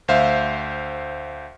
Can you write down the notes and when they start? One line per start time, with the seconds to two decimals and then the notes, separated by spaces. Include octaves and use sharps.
0.08 D2 C5 E5 F5